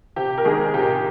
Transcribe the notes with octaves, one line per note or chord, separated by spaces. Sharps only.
C3 G4
A#4
D#3 G#3 D#4 G#4
C3 G4